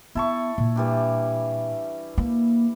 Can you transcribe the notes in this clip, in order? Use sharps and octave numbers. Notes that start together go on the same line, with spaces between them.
B3 E4 A5 C#6
A#2
E3 G3 D4
A#3